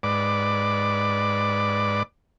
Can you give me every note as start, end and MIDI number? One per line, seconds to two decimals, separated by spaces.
0.03 2.03 44
0.03 2.03 71
0.03 2.03 74
0.03 2.03 86